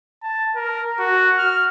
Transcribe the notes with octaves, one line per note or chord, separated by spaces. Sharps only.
A5
A#4
F#4
F6